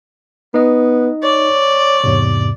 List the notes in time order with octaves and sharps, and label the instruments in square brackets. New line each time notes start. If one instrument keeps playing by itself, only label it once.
[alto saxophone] B3 [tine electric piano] D#4 D#5
[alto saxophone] C#5 [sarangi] D5
[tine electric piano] E2 G#2 C3